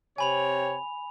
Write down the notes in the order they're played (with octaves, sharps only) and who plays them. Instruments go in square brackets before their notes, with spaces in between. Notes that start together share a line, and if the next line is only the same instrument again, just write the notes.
[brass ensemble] C3 C#5 G5 [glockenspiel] G#5 B5 F7